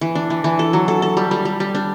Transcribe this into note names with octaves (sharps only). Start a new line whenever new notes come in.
E3
D4
E3
E3
A4
F#3
A4
A4
G3
G3
G3
G3
D4